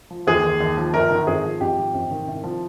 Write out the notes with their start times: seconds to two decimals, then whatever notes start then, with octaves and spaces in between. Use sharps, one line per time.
0.11 F3
0.27 D#2 G#4
0.44 D#2
0.61 D#2
0.77 F3
0.94 G1 A#4
1.11 D#3
1.27 G#1 G#4
1.44 F3
1.61 G#1 G4
1.77 F3
1.94 G#1
2.11 D#3
2.27 C2
2.44 F3